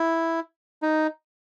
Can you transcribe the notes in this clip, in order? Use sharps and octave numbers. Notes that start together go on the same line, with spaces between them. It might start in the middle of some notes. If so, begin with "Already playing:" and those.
Already playing: E4
D#4